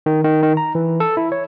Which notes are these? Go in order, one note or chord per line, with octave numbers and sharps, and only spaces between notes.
D#3
D#3
D#3
A#5
E3
A4
E4
C#5